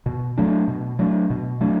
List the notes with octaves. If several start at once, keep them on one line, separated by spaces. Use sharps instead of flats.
B2
F#3 A3 D4
B2
F#3 A3 D4
B2
F#3 A3 D4